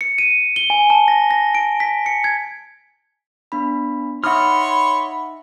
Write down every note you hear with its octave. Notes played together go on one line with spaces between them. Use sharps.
C#7
D#7
G7
G#5
A5
A#6
A#6
D7
B6
C#7
G#6
B3 D4 B5
D#4 C#5 E5 F#5 B5 C6 D#6 F6